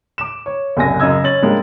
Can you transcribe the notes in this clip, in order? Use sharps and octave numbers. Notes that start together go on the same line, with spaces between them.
D6 E7
C#5
F#1 C2 G#5 A#6
F#2 C#3 D#5 E6 G#6
C#4 A6 F#7
G3 G#3 A#3 D4